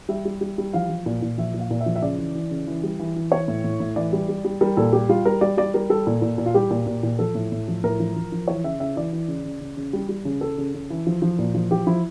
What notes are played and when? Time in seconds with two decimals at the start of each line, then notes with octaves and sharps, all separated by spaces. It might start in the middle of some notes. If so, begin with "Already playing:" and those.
0.09 G3 E5
0.25 G3
0.41 G3
0.58 G3
0.73 F3 F5
0.89 F3
1.06 A#2
1.22 A#2
1.38 F3 E5
1.54 A#2
1.59 F5
1.71 A#2
1.81 E5
1.86 F3
1.96 E5
2.02 C#3 D5
2.18 E3
2.35 E3
2.51 C#3
2.67 E3
2.83 G3
2.99 E3
3.16 E3
3.32 E3 C#5
3.48 A2
3.64 A2
3.80 A2
3.96 E3 D5
4.13 G3
4.29 G3
4.45 G3
4.61 G3 A#4
4.77 A#2 A4
4.93 G3 G4
5.09 G3 F4
5.25 G3 A#4
5.41 G3 D5
5.57 G3 D5
5.74 G3 A#4
5.90 G3 A4
6.07 A#2
6.22 A#2
6.38 A#2
6.46 F4
6.54 G3 G4
6.70 A#2
6.87 A#2
7.03 A#2
7.19 F3 A4
7.35 A2
7.52 A2
7.68 F3
7.84 A2 A#4
8.00 F3
8.16 F3
8.32 F3
8.48 E3 C#5
8.64 C#3 E5
8.80 C#3 E5
8.96 E3 D5
9.13 E3
9.28 C#3
9.45 C#3
9.61 C#3
9.77 C#3
9.93 G3
10.09 G3
10.25 C#3
10.41 C#3 A4
10.58 C#3
10.74 C#3
10.90 E3
11.07 F3
11.22 F3
11.39 A#2
11.54 F3
11.71 F3 G4
11.87 F3 E4